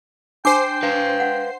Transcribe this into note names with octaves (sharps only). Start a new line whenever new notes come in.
D4 C5 G5 G#5 D6 C7
B4 F5
F#5